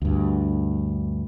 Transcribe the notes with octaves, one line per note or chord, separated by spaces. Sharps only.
D2 G2